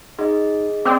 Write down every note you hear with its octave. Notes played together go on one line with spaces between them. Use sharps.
D#4 G#4 D#5
C4 D5 G5 D6